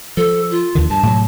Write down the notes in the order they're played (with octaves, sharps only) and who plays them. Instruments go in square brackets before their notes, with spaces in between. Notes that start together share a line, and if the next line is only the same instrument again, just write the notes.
[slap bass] F3 [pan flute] A4
[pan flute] F4
[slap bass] D#2 D3 D#3
[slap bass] G2 [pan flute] A5
[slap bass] A2 C3 F#3